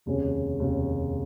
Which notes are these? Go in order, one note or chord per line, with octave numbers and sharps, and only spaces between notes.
F1 D#2 C#3 G#3 C#4
F1 D#2 C#3 G#3 C#4